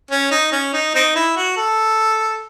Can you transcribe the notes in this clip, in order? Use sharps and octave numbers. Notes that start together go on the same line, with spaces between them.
C#4
D#4
C#4
D#4
C4 D#4
E4
F#4
A4